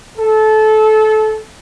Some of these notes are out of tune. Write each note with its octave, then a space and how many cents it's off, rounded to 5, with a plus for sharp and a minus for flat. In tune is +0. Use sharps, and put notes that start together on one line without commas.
A4 -20